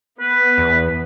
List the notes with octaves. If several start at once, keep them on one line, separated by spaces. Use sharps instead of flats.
B3 B4
E2